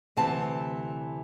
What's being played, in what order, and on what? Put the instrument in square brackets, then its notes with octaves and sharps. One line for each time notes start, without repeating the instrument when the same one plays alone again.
[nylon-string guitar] D2 C3 E3 C4 A5